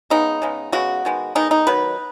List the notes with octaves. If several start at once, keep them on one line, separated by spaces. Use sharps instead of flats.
C#3 G#3 B3 D#4
C#3 G#3 B3
C#3 G#3 B3 F#4
D#3 G#3 B3
D#3 G#3 B3 D#4
D#4
D#3 F#3 B3 B4